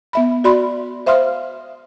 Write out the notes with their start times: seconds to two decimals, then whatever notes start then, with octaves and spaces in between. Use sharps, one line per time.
0.13 B3 E5 B5
0.44 F#4 D5 B5 C6
1.06 C5 E5 F5 C6 D#6 F6